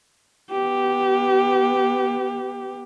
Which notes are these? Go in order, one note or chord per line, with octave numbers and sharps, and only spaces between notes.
B3 G4